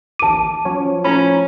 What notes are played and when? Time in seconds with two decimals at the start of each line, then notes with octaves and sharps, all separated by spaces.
0.19 A1 D#2 A5 D6 D#7
0.65 F3 F#3 C#4 C#5
1.04 A2 C#4 A#5 B5